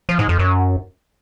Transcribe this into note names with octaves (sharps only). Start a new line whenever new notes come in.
F3
G#2
F2
F#2